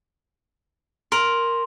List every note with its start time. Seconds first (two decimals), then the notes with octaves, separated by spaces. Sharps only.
1.12 A#4 C6